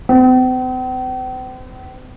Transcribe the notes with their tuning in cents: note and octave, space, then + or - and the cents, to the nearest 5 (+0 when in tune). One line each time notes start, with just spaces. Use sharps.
C4 -45